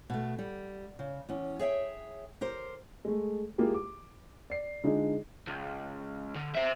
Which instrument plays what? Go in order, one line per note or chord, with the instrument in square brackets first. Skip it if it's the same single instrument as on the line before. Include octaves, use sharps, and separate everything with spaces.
[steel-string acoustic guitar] B2 A3
G3
C#3
E2 C#4
G#4 C#5 E5 G5
G4 A#4 C5
[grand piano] G#3 A3
G#3 A#3 E4 F4 G4 G#4
D6
D5 C7
D3 G#3 D4 D#4 F4 G#4
[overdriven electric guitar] C#2
D3
C5 E5